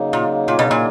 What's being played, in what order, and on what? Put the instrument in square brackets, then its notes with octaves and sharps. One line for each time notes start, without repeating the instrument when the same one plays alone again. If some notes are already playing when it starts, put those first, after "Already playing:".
Already playing: [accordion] C#3 F#3 A#3 D#4
[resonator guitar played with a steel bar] A#2
A#2
B2
A#2